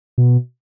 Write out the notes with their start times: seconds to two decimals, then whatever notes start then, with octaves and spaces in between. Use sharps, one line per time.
0.18 B2